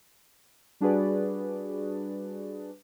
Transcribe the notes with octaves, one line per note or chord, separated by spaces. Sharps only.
G3 D4 F#4 G#4 B4 D5